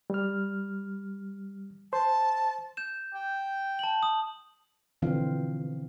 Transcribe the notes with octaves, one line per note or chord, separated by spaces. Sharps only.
G3 F6
C5 A5
G6 E7
G5
A5 F#7
D#6
B2 D3 E3 F3 C4 F5